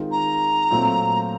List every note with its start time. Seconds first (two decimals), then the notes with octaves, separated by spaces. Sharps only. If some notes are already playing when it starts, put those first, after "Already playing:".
Already playing: D#3 G#3 C4 F4
0.12 A#5
0.71 A#2 F#3 A3 C4 F4